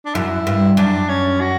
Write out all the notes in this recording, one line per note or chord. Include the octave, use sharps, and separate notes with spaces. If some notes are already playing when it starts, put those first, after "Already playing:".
D4
F#2 E4
G2
F#2 D4
C#4
F#4